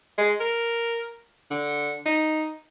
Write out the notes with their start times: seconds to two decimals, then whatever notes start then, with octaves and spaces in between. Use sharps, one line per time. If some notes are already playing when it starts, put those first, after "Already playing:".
0.18 G#3
0.40 A#4
1.51 D3
2.06 D#4